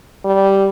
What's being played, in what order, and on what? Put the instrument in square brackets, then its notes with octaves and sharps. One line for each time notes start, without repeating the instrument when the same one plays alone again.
[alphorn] G3